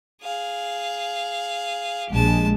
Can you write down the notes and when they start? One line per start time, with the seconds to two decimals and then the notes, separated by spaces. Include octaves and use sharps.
0.22 G#4 F5
2.10 A#1 G#3 G4 A5